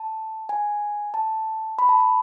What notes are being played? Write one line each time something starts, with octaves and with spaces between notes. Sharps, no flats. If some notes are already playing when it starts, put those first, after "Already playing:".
Already playing: A5
G#5
A5
B5
A5
B5